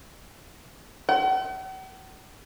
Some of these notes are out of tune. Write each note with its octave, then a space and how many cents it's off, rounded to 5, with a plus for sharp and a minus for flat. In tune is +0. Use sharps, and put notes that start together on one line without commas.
F#5 +45